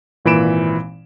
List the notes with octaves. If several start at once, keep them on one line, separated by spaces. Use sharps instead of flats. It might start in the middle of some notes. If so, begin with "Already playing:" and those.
G#1 A#2 E3 B5 D7 E7